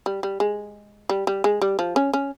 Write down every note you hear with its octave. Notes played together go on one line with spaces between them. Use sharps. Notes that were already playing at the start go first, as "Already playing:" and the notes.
G3
G3
G#3
G3
G3
G#3
G3
F3
C#4
C#4